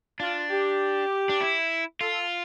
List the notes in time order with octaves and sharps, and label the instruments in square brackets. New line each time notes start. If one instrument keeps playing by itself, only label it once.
[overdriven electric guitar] D4 [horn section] F4
[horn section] G4
[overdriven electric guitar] D4
E4
[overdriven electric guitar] F4 [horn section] A4